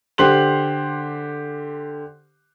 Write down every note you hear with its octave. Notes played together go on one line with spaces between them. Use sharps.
D3 G4 C5 C6 F#6 F#7